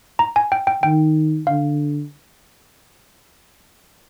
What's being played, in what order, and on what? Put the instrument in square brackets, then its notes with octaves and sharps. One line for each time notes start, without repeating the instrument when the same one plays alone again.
[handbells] A#5
G#5
G5
G5
[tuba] D#3 [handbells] G5
[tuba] D3 [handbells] F5